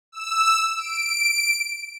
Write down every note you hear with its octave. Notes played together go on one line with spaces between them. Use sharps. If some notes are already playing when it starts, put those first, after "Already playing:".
E6
D7